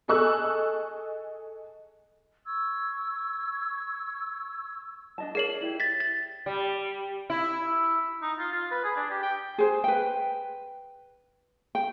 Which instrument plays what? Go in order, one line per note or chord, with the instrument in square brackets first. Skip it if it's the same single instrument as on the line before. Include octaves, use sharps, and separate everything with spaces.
[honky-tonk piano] G#4 A4 D#5 C#6 E6 F#6
[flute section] C#6 E6 G#6
[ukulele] D4 D#5 A5
[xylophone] G#4 C7 F#7 [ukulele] A#4 C#5 D5
[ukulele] E4 G4
[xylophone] A6 B6
A6
[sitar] G3
E4
[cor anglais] D#4
F4
F4
B4
G#4
D4
G4
G5
[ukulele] G#4 C5
B4 G5
G5